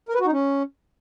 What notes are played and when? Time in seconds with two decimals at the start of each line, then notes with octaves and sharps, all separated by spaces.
0.09 A#4
0.15 B4
0.20 F#4
0.26 D#4
0.32 C#4